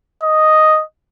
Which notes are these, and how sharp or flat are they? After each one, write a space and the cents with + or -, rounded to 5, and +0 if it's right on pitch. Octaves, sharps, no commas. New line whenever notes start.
D#5 +0